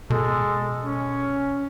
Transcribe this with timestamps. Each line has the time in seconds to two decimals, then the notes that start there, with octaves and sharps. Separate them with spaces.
0.10 B2 G#3 A4
0.84 C#4